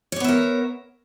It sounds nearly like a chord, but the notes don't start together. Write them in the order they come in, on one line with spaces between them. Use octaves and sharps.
C#5 D5 B3 E5 A#4